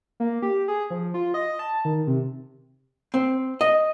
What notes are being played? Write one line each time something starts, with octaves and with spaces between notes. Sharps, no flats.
A#3
G4
G#4
F3
F4
D#5
A5
D#3
C3
C4
D#5